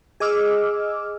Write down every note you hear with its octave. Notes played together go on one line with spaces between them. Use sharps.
G#4 D#5 D6 E6 F6